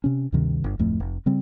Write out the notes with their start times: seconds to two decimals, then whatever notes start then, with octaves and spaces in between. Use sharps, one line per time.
0.04 C3 C#4
0.32 D2 G2 C3 D#3
0.64 G1
0.79 D1 F2 A2 A3
1.00 F1
1.26 C#3 G3 C4